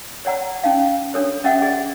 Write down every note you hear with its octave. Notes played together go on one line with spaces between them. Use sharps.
C#5 D5 F#5 A#5
C#4 D#4 F5
D4 A4 C#5
C#4 D#5 E5 F#5
G#4 D5 D#5